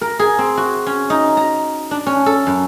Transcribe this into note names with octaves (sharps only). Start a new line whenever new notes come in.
A#4
G#4
C4
F#4
C#4
D#4
A#5
D4
C#4
A4
F#2